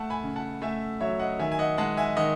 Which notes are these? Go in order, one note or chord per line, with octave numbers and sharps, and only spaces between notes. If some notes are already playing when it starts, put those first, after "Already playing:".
Already playing: A3 F#5 A5
G#5 B5
C#3
F#5 A5
A3 E5 G#5
F#3 C#5 E5
D#5 F#5
D#3 E5 G#5
G#5
D#5 F#5
G#3 F#5 A5
E5 G#5
D#3 D#5 F#5